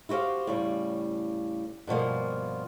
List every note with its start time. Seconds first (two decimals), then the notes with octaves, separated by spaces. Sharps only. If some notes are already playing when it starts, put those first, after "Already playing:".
0.09 E4 F#4 G4 C5 F5
0.47 A2 C#3 G3
1.87 G2 B2 F3 A#3